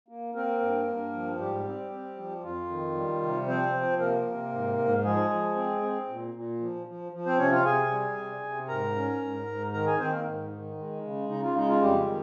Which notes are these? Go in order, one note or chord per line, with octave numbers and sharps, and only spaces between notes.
A#3
A#3 C4 A#4
G2
G2
F3
G#2 G3 G4
C4
C4
F3
F2 F4
D#3
G3
C3
F3 C4 C5
F3
C3 A#3 A#4
C3
G#2
G#2
F3 G#3 G#4
F3
C4
C4
A#2
A#2
F3
F3
F3
C4 C5
C3 C#4 C#5
F4 F5
C3 G#4 G#5
G3
C3
C3
G#2 A#4 A#5
C#4
G#2
G#2
D#3 A#4 A#5
G#4 G#5
D#3 C4 C5
A#3 A#4
G#2
D#3
G#3
C#3
C#3 D#4
F4
G#3 D#4
F4
F2 G3 G4
D#3